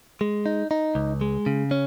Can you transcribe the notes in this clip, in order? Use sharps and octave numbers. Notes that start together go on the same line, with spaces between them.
G#3
D#4
D#4
C#2
G#3
C#3
C#4